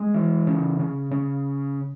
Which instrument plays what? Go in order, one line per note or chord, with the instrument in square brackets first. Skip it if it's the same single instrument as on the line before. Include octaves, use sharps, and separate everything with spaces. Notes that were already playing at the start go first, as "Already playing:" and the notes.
Already playing: [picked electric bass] G#3
E3
C#3
C#3
C#3